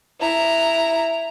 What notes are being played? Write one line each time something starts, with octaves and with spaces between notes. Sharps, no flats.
E4 A#5